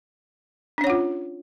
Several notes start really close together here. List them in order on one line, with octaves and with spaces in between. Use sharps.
D4 C#4 C#5 F#5 F4